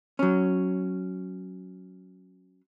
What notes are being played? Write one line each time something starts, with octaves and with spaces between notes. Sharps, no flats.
F#3 C#4